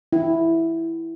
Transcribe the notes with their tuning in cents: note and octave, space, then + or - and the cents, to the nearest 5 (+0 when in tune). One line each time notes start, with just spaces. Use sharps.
E4 +0